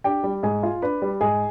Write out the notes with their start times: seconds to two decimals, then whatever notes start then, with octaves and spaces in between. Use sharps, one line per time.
0.04 D4 G4 G5
0.24 G3
0.43 G#2 G#4 G#5
0.63 F4
0.82 D4 B4 B5
1.02 G3
1.21 G#2 G#4 G#5